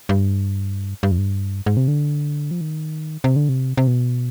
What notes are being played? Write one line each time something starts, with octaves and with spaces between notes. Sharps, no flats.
G2
G2
F2
G2
G#2
C3
D3
F3
D#3
C3
D3
C3
C3
B2